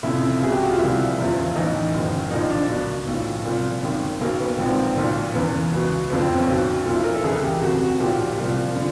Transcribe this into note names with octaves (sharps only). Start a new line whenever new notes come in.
F1 F2 C#3 F3 E4
C#2 B2 G#4
G4
F#4
F4
C2 A#2 F3 E4
F#1 E2 C#3 F3
B1 A2 E3 D#4
F#1 F#2 D#3
A#1 A#2 F3 D#4
D4
C#2 B2
B1 A2 F3
C2 A#2 F3
G#1 F#2 D#3
B1 B2 A#3
B3
A#1 G#2 F3 C4
B1 A#2 F3
E2 C#3 E3 B3
C#2 B2
F#1 F2 D3 F3 B3
C4
C#4
B1 B2
B1 A#2 F3
E4
A#4
A4
C#2 C#3 E3 G#4
G4
E1 D2 C3 F#4
F#4
B1 A#2 F3 G4
C2 A#2 F3
D3 F3